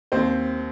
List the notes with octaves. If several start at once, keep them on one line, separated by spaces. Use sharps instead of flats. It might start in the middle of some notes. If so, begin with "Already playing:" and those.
D#2 C4 C5